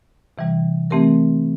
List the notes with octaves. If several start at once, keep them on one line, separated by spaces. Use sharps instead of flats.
C3 E3 G3
E3 A3 C4 G4 A#4